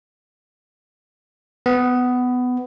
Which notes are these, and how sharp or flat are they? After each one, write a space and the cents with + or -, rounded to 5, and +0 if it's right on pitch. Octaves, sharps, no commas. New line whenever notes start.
B3 +15